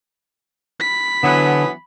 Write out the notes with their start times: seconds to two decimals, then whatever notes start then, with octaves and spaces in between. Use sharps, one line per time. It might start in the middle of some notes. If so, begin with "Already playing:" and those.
0.80 B5 B6
1.23 D3 E3 F#3 B3